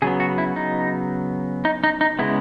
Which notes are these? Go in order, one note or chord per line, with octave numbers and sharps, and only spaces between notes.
C#3 F#3 B3 G#4
F#4
E4
D#4
D#4
D#4
D#4
C#3 G#3 B3 E4